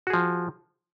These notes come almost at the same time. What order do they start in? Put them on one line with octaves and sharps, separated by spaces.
F#4 G#4 F3